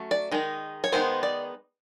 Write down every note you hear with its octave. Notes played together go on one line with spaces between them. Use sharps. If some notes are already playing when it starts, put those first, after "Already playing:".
Already playing: F#3 A3 C#4
D5
D#3 G#3 D#4
C#5
D#3 G#3 B3 D#4 C5
D5